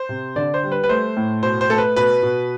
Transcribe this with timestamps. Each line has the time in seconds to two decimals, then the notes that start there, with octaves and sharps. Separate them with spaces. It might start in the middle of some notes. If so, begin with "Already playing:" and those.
Already playing: C5
0.09 C3
0.36 D3 D5
0.54 C5
0.63 G3
0.72 B4
0.84 B4
0.89 A3 C5
1.17 A2
1.43 B2 C5
1.61 C5
1.70 A3 A4
1.78 B4
1.96 B2 B4
2.23 B2